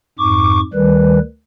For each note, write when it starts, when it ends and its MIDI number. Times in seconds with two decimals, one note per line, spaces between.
0.19 0.60 41
0.19 0.60 44
0.19 0.60 85
0.19 0.60 86
0.74 1.19 38
0.74 1.19 51
0.74 1.19 55
0.74 1.19 71